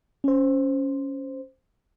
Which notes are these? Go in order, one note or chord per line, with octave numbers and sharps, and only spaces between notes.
C#4 C5